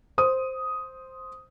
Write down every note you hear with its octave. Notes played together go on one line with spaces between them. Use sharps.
C5 D#6